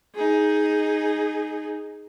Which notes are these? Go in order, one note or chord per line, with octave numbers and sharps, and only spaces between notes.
D#4 G#4